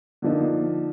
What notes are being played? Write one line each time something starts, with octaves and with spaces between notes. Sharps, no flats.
D3 F3 A#3 D#4